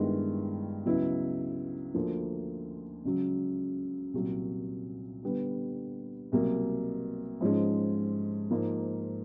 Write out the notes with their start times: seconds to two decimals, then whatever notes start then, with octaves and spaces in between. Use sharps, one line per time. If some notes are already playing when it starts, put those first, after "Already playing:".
Already playing: G2 D#3 G#3 B3 E4
0.86 C#2 C#3 F#3 B3 E4
1.94 D2 D3 F3 A#3
3.05 C#2 C#3 F#3
4.13 C2 A#2 F#3
5.23 D3 G3 B3
6.32 C2 B2 F#3 A#3
7.41 G#2 F3 G#3 C#4
8.50 G#2 F3 A#3